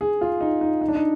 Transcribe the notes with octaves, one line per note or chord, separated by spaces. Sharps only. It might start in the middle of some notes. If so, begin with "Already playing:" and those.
G#4
F4
D#4
D#4
D#4
D4
D#4